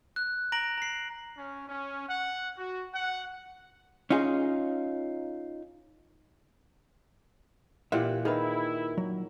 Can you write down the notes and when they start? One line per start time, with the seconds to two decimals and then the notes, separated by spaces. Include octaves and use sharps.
0.16 F#6
0.52 A#5 A#6 D7 F#7
0.78 A#5 C7
1.37 C#4
1.68 C#4
2.08 F#5
2.57 F#4
2.93 F#5
4.10 C#4 D#4 F4 G#4
7.92 A#2 E3 G4 E5 F#5
8.25 D#3 E4 G#4 A#4 B4
8.98 F#3